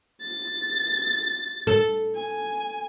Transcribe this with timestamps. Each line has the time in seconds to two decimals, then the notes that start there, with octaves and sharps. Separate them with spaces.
0.22 A6
1.67 A4
2.15 G#5